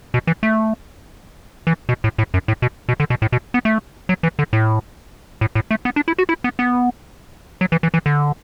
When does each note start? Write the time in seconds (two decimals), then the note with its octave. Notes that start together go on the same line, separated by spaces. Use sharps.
0.14 B2
0.27 E3
0.43 A3
1.67 E3
1.89 B2
2.04 A2
2.18 A2
2.34 F#2
2.48 A2
2.62 B2
2.89 B2
3.00 D3
3.10 B2
3.22 A2
3.32 B2
3.54 B3
3.65 A3
4.09 F#3
4.23 E3
4.39 D3
4.53 A2
5.41 A2
5.55 A2
5.71 A3
5.85 B3
5.96 D4
6.08 E4
6.19 F#4
6.29 E4
6.44 B3
6.59 B3
7.61 F#3
7.72 E3
7.83 E3
7.94 E3
8.06 D3